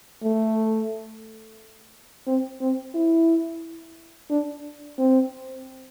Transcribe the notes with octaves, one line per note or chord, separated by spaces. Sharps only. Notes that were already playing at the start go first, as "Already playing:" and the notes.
A3
C4
C4
E4
D4
C4